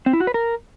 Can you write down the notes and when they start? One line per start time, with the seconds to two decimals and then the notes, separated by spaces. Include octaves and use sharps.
0.06 C4
0.13 E4
0.20 F#4
0.27 B4
0.34 A#4